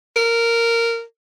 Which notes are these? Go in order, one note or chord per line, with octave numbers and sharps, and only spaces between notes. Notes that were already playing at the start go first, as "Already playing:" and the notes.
A#4